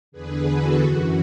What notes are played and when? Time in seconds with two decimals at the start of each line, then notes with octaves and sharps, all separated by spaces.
0.12 E2 D3 G#4 B4
0.47 F#4 A4
0.81 F#2 E3 F#4